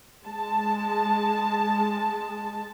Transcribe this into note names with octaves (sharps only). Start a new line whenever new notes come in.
G#3 A5